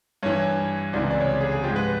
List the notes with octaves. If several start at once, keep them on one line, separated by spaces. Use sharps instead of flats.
G2 E3 C#5
C#2 C3 E3 D5
D5
C#5
G#4
G#4
G#2 F3 G4
B4